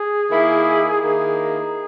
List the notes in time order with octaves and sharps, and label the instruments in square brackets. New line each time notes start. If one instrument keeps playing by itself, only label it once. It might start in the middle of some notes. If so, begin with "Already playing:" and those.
Already playing: [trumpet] G#4
[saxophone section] D#3 A#3 E4
[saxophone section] D#3 A#3 E4 [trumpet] G#4